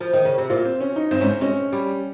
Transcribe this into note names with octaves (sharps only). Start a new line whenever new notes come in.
F3
D#3
C#3
C3
A#2 F4
C4
C#4
D#4
G2 C4
G#2 C#4
C4
G#3 C#4
G3